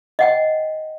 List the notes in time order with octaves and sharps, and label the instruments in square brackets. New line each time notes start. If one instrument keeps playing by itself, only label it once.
[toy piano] D#5 F#5 G5